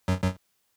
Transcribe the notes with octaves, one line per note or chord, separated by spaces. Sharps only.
F#2 F#3
F#2 F#3